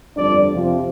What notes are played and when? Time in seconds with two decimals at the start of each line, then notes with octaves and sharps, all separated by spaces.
0.16 G1 F2 D3 F3 D4 D5
0.48 F2 C3 F3